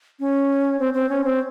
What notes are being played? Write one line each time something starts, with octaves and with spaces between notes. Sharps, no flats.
C#4
C4
C4
C#4
C4